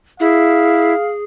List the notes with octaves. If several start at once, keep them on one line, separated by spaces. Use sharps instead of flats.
E4 G#4 F5